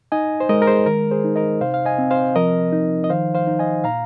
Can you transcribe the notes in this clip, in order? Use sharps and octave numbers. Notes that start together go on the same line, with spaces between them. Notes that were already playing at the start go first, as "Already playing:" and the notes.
D#4 D#5 G#5
C5
G#3 A#4 D#5
A#4
G#4 C5
D#3 A#4
G#4 C5
D#4
A#4 D#5
C3 C5 F5
F5
D#5 G#5
C4
C5 F5
F3 A#4 D#5
D#4
D#5
D#3 C5 F5
C5 F5
D#4
D#5 G#5
A#2 F5 A#5